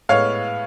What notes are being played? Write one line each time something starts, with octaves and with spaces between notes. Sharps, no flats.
A2 G#3 B3 C#5 F5